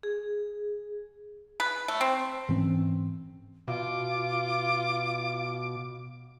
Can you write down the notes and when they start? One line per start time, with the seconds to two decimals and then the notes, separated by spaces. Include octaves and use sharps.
0.03 G#4
1.60 B4
1.88 A3
2.01 C4
2.49 G#2 E3 C4 C#4
3.68 B2 F4 D6